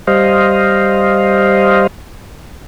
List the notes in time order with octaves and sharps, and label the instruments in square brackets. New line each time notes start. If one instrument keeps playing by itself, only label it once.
[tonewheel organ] G3 C5 D#5 F5